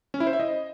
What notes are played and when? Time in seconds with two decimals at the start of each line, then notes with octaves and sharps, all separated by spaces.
0.14 C#4
0.20 E4
0.27 C5
0.33 E5
0.40 D#5